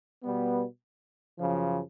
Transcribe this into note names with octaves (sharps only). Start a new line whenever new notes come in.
B2 G3 B3
F#2 C#3 F3